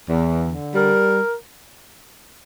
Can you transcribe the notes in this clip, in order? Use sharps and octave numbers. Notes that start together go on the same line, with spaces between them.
E2
D3
G3 A#4